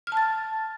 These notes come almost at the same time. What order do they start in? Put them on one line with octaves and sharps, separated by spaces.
F6 A5 A6